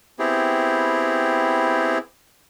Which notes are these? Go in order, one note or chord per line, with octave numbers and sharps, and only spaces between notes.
B3 C4 E4 G4 G#4